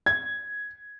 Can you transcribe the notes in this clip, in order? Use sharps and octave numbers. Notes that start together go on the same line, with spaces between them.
G#6